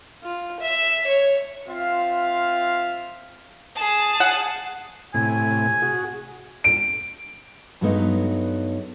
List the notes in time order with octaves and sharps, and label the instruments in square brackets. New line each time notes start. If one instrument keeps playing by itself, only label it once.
[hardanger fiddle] F4
E5
C#5
[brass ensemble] C4 F4 E5 F5
[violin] G#4 A5
[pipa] F#5
[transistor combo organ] A2 C3 [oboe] G#5
[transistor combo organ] F#4 G#4
[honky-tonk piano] D7
[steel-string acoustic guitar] G2 F#3 G#3 A3 B3 D#4